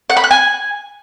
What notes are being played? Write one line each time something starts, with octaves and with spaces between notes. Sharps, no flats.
F#5
B5
F#6
G#5